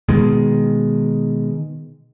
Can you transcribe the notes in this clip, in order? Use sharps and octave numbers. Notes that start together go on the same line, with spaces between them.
B2 D#3 G#3